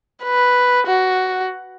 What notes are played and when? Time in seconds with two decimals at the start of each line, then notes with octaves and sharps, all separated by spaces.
0.23 B4
0.87 F#4